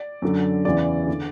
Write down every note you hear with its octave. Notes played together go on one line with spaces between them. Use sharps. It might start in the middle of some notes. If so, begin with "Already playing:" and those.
Already playing: D5
F#2 D3
E2 C#3 E3 D5
D3